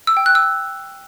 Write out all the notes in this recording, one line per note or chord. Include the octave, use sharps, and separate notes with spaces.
E6
G5
F#6
E6